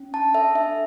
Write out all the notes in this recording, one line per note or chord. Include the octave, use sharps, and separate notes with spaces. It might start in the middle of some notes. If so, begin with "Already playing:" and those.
Already playing: C#4
D4 A5
A4 E5
D4 E5